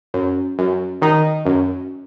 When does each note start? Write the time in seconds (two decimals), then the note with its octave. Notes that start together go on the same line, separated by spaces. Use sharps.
0.14 F#2
0.59 F#2
1.02 D#3 D#4
1.46 F#2